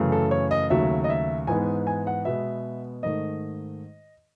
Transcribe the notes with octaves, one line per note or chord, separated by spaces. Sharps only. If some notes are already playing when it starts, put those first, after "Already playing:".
Already playing: F#2 C#3 E3 A3
A4
C#5
D#5
D#2 C#3 F#3 A3 E5
D#5
E5
G#2 E3 G#3 B3 G#5
G#5
F#5
B2 G#3 B3 E5
G#2 D#3 A3 D#5